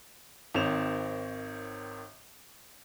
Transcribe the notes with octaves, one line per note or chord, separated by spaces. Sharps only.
G#1 D#3 C4 C#5 E7 F7